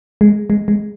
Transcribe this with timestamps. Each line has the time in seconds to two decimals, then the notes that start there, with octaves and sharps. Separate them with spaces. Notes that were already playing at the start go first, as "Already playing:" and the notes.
0.21 G#3
0.50 G#3
0.68 G#3